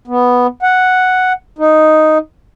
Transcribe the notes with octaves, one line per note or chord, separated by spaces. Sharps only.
B3
F#5
D#4